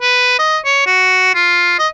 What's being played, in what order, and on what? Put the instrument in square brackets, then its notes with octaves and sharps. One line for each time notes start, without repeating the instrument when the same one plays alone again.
[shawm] B4
D#5
C#5
F#4
F4
D#5